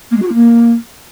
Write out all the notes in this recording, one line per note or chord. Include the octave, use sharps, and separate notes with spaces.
A#3
G#3
F#4
F4
A#3